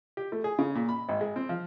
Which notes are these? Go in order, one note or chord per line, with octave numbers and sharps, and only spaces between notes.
G4
A3
G#4
C#3
A#2
B5
G#1
G#3
C4
F3